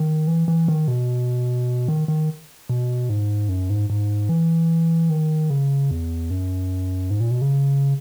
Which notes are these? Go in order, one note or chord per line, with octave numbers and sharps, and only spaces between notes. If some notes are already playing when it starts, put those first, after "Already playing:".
Already playing: D#3
E3
E3
D#3
B2
D#3
D#3
B2
G#2
F#2
G#2
G#2
E3
D#3
C#3
E2
F#2
G#2
A#2
B2
C#3